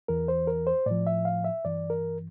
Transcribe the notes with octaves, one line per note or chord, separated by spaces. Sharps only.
E2 E3 A#4
C5
A#4
C5
A2 F3 D5
E5
F5
E5
G2 E3 D5
A#4